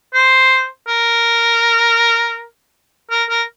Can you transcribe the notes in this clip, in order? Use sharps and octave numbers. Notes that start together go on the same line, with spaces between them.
C5
A#4
A#4
A#4